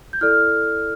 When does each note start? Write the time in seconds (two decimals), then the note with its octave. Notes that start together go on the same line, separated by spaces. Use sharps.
0.13 G6
0.21 E4 A4 D5 F6